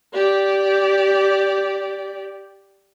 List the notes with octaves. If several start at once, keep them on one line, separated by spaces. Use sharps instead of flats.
G4 D5